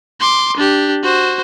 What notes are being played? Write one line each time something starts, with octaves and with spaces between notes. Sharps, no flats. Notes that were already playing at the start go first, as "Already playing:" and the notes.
C6 D6
D4 G4
F#4 C5